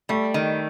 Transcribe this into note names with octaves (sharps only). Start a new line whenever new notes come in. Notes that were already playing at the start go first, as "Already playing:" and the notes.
G3 A3
D#3